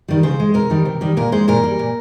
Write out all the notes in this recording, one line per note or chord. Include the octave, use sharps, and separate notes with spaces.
D#3 G3
C#3 C5
G#3
C3 A#4
D#3 G3
C3
D#3 G3
A#2 A#4
G#3 C5
A#2 A#4
G3
A#2